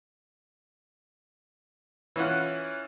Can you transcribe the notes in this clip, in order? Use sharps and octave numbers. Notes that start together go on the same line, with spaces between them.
E3 C#4 E4 F4 F#5